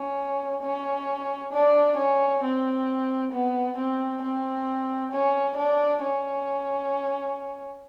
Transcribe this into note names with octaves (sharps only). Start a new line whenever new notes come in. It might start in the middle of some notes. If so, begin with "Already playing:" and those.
Already playing: C#4
C#4
D4
C#4
C4
B3
C4
C4
C#4
D4
C#4